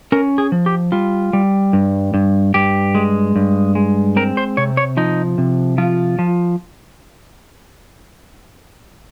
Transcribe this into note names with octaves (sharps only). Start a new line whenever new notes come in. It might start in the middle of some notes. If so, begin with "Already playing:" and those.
C#4 A#4
G#4
F3
G4
G3 F4
G3
G2
G2
G2 G4
G#3
G2
G#3
C4 A#4
C5
C3 C#5
C#5
F3 D#4
C3
F3 F4
F3